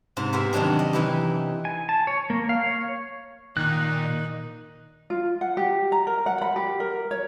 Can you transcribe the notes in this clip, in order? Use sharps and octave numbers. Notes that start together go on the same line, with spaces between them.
G#2 C3 C5
B3 G4 G#4 A#4 E5
C3 D#3 F#3 D4 G4
D#5
C3 E3 D#4 E4 G4
G#5
A5
C#5
A#3
F5
C#5
A#2 D#3 D#4 F#6
F4
F#5
G4
A#5
A#4
F#5
B5
G4
A#4
C#5